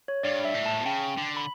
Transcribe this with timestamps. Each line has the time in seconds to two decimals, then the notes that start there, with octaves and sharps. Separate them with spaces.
0.08 C#5
0.23 G2 D5
0.45 E5
0.55 A2
0.66 A5
0.80 B2
0.85 C#3 G5
1.17 D3
1.37 B5